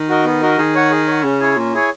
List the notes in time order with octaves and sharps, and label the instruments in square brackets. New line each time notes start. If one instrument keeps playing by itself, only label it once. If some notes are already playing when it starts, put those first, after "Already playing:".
Already playing: [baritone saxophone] D#3
[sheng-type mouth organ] F#4 A#4 D#5
B3
F#4 A#4 D#5
[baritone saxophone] D#3 [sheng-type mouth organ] G#4
[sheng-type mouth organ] C#5 F#5
G#4
C#5 F#5
[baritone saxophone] C#3 [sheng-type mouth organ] C#4
[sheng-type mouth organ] E4 G#4 C#5 G#5
[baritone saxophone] A#2 [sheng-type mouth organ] C#4
[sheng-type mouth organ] E4 G#4 C#5 G#5